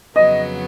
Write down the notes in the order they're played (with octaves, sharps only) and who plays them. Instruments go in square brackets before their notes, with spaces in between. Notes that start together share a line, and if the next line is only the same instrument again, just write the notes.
[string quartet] F2 C#3 F#3 B3 [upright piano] D#5